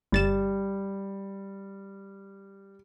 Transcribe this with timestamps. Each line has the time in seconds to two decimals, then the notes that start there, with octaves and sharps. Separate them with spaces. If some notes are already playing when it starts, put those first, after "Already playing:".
0.12 G1 G3 A6 E7